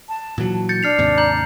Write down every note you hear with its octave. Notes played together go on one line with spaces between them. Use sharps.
A5
A#2 E3 F#3
G6 A6 C#7
D4 F6 C7 F7
D#2 G#2 C3
A#5 G6 F#7